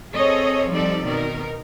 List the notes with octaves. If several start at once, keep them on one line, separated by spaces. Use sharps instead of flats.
C4 G#4 A4 C#5 D#5
F3 G3 C4 D#4 A4 D5
B2 D#3 D#4 A#4